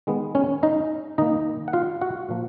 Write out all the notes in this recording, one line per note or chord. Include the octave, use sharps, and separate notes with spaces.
D#3 G#3 B3
C#4 C#5
D#4 D#5
D#3 A#3 D#4 D#5
F#5
F4 F5
F#4 F#5
A#2 F3 A#3